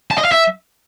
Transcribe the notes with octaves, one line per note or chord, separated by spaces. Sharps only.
A5
D#5
F5
E5